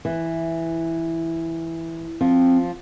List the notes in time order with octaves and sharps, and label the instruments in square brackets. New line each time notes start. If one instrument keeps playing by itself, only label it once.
[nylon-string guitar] E3
[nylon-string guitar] F3 [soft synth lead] C4